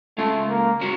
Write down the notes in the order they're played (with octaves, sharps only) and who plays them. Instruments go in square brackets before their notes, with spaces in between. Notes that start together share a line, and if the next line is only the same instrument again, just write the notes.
[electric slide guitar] G#3 C#4 F4 [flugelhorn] A3
[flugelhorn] A#3
[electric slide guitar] G#3 C#4 F#4